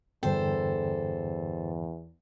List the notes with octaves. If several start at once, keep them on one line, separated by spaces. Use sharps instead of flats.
E2 G2 D3 A4 C5 G5